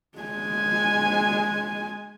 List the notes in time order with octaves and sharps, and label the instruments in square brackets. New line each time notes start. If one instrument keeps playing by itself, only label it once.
[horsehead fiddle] G#3 G#5